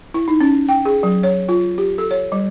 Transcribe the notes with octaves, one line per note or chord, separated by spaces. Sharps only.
E4
D#4
C#4
G5
G#4
F#3
C#5
F4
G4
A4
C#5
G3